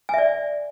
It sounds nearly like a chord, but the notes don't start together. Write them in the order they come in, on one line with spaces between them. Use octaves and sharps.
G#5 E5 D5